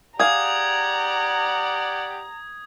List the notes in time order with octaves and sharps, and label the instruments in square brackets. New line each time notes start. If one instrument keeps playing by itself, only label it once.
[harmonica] G4 D5 F#5 [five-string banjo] G#4 F5 [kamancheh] A#5 [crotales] D#6 G#6